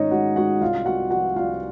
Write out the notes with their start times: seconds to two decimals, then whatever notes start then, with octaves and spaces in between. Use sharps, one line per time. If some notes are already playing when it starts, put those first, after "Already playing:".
Already playing: G#2 D#3 C#4 D#4 C#5 D#5
0.11 G#3 F#4 F#5
0.36 G#2 F#4 F#5
0.61 C2 F4 F5
0.86 C2 F#4 F#5
1.11 F3 F#4 F#5
1.36 C2 F4 F5